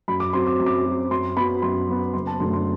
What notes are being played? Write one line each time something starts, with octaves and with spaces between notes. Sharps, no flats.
F#2 B5
D6
F#3 C4 C6
D6
F#2
D6
F#3 C4
F#2 C6
F#3 B3 B5
F#2 C6
F#3 B3
F#1 C6
A5
F#2 D3 A3 C6
C6